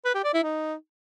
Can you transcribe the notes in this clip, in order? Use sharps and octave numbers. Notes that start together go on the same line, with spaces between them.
B4
G4
D5
E4
D#4